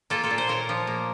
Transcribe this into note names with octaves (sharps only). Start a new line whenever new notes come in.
A#3 F4 A4
F4 A4
A#2
C5
A#2 A#4 C#5
F3
A#3